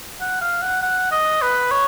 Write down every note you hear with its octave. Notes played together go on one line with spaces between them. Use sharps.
F#5
F5
F#5
F#5
D#5
B4
C#5